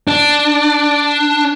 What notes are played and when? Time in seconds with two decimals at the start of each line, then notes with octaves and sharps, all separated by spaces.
0.08 D4